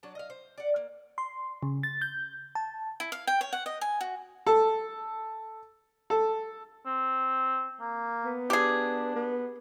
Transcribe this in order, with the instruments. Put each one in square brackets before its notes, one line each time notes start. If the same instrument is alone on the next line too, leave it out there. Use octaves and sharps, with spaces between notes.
[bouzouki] F#3 D4 A5
D#5 F5
C5
D5 F#5
A#3
[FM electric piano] C6
C#3
A6
G6
A5
[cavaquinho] E4
F5
G5
C#5
F#5
D#5
G#5
F#4
[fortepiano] A4
A4
[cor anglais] C4
A#3
[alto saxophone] B3
[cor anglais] D4 [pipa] G4 G#4
[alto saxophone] B3